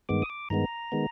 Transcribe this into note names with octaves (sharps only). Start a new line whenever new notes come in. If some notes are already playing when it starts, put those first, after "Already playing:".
G2 D#3 G#3 B3 D6
D#6
D6
G2 D#3 G#3 B3 A#5
D#3 G#3 B3